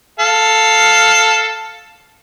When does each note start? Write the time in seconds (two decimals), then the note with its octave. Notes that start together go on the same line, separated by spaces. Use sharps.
0.20 A4 F5